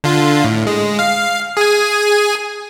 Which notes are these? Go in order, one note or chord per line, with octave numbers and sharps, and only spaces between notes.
D3 F4
A2
G#3
F5
G#4 G#5